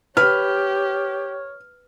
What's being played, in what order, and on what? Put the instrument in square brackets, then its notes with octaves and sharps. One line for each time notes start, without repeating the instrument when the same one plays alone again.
[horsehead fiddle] G4 [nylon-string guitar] B4 [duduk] C#5 [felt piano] F6